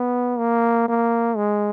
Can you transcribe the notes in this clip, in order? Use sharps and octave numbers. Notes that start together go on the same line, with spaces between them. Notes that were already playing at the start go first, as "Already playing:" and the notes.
Already playing: B3
A#3
A#3
G#3